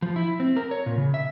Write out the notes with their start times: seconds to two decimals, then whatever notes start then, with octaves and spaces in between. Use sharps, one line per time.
0.02 F3
0.16 E4
0.40 C4
0.56 A#4
0.71 C#5
0.86 A#2
0.98 C#3
1.14 E5